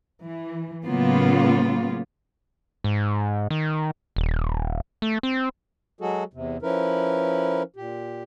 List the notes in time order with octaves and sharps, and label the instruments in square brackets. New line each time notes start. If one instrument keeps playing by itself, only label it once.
[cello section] E3
A2 C#3 F#3 A#3 B3 F4
[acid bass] G#2
D#3
D#1
A3
C4
[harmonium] F#3 G#3 F#4 G#4 A4
E2 C3
F3 C#4 E4 A#4 B4
A#2 G4